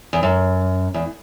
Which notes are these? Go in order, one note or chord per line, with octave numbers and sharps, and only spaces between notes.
E2
F#2
E2